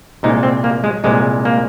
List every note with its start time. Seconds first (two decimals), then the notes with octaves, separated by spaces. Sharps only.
0.23 C2 A#2 G#3 D#4
0.43 C4
0.64 A#3
0.84 G#3
1.04 C2 A#2 G#3
1.45 A#3